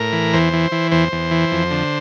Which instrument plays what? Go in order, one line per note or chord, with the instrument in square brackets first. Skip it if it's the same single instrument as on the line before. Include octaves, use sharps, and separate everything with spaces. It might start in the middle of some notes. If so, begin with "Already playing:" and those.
Already playing: [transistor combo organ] A2 A#4
E3
E2 C5
E3
E3
E2 C5
E2
E3
F2
D3